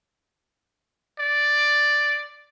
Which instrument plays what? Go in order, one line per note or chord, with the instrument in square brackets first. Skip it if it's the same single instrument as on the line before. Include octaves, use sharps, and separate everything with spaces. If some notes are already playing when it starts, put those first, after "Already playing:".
[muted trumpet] D5